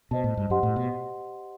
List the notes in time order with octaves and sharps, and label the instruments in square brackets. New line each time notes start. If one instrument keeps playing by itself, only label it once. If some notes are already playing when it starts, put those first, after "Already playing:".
[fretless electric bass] B2 [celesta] C5 D#5 A5
[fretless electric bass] A2
G2
[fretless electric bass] F#2 [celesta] G4 C5 D#5 F#5 C6
[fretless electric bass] A2
B2